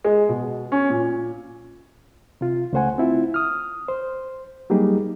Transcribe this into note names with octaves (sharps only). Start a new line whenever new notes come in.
G#3
B2
C#4
A#2
C3 F4
C#2 C#3 A3 C5 F#5 G#5
C4 E4 F4
D#6 F6
C5
F#3 G3 A#3 D#4 G4 G#4